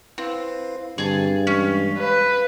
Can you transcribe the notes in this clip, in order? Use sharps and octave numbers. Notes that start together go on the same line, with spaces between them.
C4 E4 B4 F5
G2 D3 G3 C4 G#4 A5
E3 G#3 C#4
B4 F5